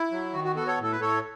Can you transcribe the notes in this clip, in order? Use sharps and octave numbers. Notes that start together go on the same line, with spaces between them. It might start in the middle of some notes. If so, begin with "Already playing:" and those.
Already playing: E4
F#3
D#3 F#4
F#4
B3 F#4 A4
A4 C#5
A2 A4
B4
A2 A4 C#5